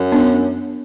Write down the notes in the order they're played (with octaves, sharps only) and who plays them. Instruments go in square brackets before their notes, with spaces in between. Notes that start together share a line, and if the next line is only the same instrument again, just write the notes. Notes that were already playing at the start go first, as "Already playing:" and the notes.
Already playing: [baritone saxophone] F#2
[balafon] B3 D4